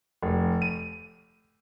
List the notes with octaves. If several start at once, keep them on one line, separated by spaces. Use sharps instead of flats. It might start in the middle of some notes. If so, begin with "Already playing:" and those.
F1
D#7